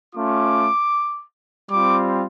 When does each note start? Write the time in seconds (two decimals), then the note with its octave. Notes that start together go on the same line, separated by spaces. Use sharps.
0.15 A3 C#4 F4 D6
1.70 G3 C4 F4 D6